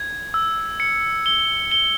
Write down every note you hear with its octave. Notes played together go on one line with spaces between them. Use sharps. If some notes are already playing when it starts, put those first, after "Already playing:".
Already playing: G#6
E6
C#7
G7
G7